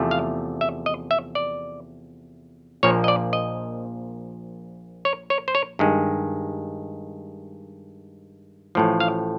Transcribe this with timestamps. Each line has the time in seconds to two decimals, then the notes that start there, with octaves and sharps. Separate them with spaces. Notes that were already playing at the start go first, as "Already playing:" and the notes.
Already playing: E2 C3 F3 A3
0.11 F5
0.61 E5
0.86 D#5
1.11 E5
1.35 D5
2.83 A#1 A#2 F3 A#3 C#5
3.04 D#5
3.08 D5
3.33 D#5
5.05 C#5
5.30 C#5
5.48 C5
5.55 C#5
5.79 G2 D#3 G#3
8.75 A1 A2 F3
9.00 F5